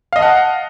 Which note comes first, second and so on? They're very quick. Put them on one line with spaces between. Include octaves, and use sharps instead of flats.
F5 D#5 A5 F#5